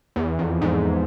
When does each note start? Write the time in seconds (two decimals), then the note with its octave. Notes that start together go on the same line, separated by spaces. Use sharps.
0.16 E2
0.39 F2
0.61 G#2